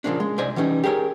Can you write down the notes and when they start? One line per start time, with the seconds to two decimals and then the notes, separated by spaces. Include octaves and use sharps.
0.04 A#2 C#3 F3 A#3 C#4 D4
0.20 G#3
0.38 C2 C5 D5 D#5 G#5
0.56 E3 G3 C#4 D#4
0.84 G4 G#4 A#4 C5 C#5